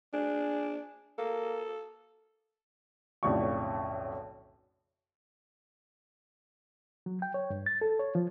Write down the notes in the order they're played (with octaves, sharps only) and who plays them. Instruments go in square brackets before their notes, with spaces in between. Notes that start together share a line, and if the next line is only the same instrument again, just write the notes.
[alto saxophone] D4 [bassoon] G#4
[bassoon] A#3 [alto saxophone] A4
[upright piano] B1 F2 A2 C#3 D5 C#6
[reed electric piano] F#3
G5
C#5
G2
A6
A4
C#5
F3